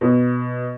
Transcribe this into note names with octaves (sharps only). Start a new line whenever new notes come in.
B2